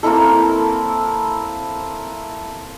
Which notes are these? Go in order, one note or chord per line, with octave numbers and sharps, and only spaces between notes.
A#3 C4 E4 A4